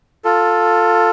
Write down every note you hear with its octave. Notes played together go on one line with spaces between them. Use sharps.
F4 A4